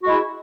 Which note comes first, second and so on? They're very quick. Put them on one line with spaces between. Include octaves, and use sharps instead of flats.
F#4 G#3 E4